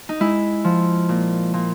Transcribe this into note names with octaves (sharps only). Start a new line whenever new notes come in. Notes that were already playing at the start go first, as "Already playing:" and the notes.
D#4
G#3 E4
F3
A#2
A#2